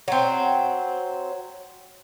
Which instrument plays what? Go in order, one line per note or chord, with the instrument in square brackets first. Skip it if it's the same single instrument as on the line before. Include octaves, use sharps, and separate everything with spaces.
[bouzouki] F#3 C4